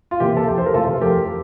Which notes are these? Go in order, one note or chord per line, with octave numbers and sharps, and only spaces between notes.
F4
C3 E3 A#3 G4
A4
F2 G4
C5
A#4
C3 E3 A3 F4 A4
F2 G4 A#4